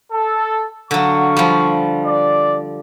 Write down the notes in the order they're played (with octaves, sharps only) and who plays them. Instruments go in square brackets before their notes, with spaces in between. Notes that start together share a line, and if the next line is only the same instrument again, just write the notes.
[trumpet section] A4
[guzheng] D3 F#3 [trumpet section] F5 C#6
[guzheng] F3 G3
[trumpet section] D5